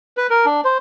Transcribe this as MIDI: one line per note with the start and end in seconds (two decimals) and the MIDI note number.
0.17 0.27 71
0.30 0.46 70
0.46 0.61 62
0.64 0.78 72